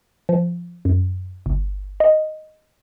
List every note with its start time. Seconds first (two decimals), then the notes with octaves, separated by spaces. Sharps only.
0.29 F3
0.85 F#2
1.46 G1
2.00 D#5